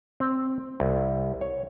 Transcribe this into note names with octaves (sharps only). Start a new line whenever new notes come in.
C4
C2
C#5